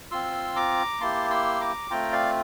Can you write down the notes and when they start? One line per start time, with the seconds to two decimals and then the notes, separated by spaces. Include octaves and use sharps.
0.11 C4 F4 C6 E6
0.56 A#5 D6
1.01 A#3 E4 G4 A5 C6
1.31 C6 E6
1.61 A#5 D6
1.90 A3 C4 F4 G5 A#5
2.13 D5 F5